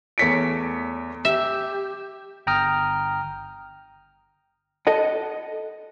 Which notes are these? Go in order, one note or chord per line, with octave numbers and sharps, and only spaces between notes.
E2 A3 C#5 B6 C#7 D7
G4 E5
G1 G5 A#5 D#6 F6
A4 D#5 F#5